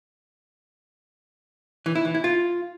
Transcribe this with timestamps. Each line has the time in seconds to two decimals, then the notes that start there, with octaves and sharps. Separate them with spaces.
1.86 E3
1.95 E4
2.05 E3
2.14 E4
2.24 F4